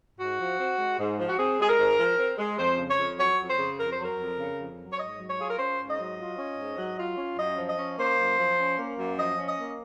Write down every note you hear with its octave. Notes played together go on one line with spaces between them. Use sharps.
G#2 F#4
F3
C4
G#3
G#2
F3
F#4
C4 G#4
G#3 G#4
A#4
G#2
F3
C4
G#3
F2 C5
C#3
C#5
F2
F#3 C#5
F2
C5
C#3
F2 A#4
C5
F#3
A#4
F2
C#3
F2
F#3
C#5
G#2 D#5
F#3
C#5
F4 G#4
A#4
C#4 C5
G#2
D#5
F#3
F4
C#4
G#2
F#3
F4
C#4
F#2 D#5
F3
D#5
C#4
A#3 C5
F#2
F3
C#4
A#3
F#2
F3 D#5
C#4
D#5
A#3